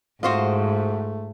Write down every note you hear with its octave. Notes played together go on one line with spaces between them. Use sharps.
G#2 A3 F4 F#4 C5 D#5